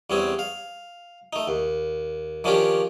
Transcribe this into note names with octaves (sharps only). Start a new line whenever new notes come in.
E2 G3 C4 C#4 G#4
F5
A3 D#4
D#2
D#3 F3 C#4 D4 F4 G4